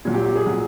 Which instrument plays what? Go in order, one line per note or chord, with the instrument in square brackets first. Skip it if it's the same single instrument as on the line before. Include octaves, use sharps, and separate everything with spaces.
[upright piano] A#2 F#3
G4
G4
G#4
A#2 F#3